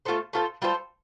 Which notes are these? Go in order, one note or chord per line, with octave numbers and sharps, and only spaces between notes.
A3 F4 A4 C5
A3 F4 A4 C5
G3 F4 A4 C5